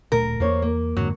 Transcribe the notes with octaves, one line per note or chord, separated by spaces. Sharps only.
D1 A#2 A3 A#4
E2 A#3 C5 C#5
A#3
F2 G#2 D3 F#3